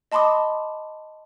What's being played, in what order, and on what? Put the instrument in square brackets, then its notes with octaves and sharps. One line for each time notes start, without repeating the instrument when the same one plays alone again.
[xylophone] D#5 A5 B5 C6 D6 D#6